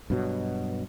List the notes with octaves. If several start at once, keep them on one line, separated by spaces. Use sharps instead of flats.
G2 B2 F#3